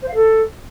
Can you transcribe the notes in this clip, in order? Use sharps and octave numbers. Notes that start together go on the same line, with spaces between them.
C5
F5
A4